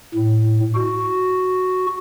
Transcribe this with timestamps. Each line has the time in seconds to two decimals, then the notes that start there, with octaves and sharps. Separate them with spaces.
0.15 A2
0.75 F#4